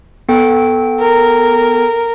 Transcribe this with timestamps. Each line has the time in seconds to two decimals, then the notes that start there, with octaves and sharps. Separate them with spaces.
0.29 B3 A4 G5
1.00 A#4